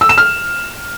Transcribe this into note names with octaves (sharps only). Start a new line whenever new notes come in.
E6
E7
F6